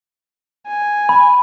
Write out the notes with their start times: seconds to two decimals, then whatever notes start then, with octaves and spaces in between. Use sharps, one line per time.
0.67 G#5
1.09 B5